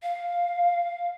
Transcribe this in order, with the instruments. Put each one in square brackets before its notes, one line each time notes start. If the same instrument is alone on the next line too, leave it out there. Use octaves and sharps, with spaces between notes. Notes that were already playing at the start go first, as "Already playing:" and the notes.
[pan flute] F5